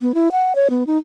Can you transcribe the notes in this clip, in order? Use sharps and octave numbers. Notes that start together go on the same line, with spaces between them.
B3
E4
F#5
C#5
B3
D#4